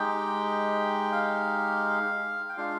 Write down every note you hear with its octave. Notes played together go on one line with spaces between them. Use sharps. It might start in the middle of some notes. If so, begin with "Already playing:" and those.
Already playing: G#3 D#4 G4 G5
F5
G5
G#3 D4 F4 F5